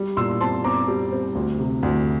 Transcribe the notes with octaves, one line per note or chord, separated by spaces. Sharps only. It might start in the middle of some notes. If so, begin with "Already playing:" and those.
Already playing: G3
A#2 C6 E6
C4 A5 C6
C4 A#5 D6
G3
C4
D2
C3
D2